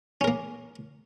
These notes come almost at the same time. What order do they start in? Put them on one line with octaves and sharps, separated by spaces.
C#4 A#4 A#3